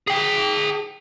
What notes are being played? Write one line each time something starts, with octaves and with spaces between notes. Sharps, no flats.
G#4 G5